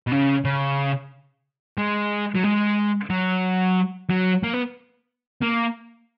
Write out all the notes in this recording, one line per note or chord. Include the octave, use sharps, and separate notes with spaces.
B2
C#3
C#3
G#3
F#3
G#3
F#3
F#3
A#3
B3
A#3